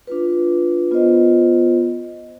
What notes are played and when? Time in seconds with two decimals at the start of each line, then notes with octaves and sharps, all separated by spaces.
0.07 D4 F4 B4
0.91 B3 F4 C5 D#5